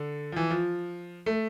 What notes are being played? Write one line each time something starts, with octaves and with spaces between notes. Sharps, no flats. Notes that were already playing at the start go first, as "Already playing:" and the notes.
Already playing: D3
F3
E3
F3
A3